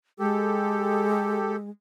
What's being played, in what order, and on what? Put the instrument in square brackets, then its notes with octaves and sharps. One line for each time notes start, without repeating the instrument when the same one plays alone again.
[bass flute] G#3 [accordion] G4 A4